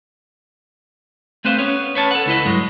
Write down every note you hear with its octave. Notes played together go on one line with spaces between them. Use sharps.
A3 C4 B4 C5 F5
B3 C#4 C#5
B4 C#5 A5
A4 F#5
C#2 E4 B4 D#5
G2 F#3 G#3